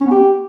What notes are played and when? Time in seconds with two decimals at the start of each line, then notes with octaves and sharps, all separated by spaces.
0.01 C#4
0.06 B3
0.11 G4